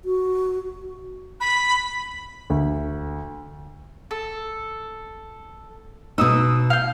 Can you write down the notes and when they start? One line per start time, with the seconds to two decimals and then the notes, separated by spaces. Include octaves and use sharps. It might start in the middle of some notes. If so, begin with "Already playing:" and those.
0.05 F#4
1.40 B5
2.50 D2
4.11 A4
6.18 B2 D#4 D#6 E6
6.70 F5 G6